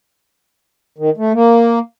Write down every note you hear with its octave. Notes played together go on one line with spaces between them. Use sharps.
D#3
A3
A#3